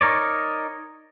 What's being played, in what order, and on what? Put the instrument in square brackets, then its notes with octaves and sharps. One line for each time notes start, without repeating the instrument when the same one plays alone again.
[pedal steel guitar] D#4 A#4 C#5 D5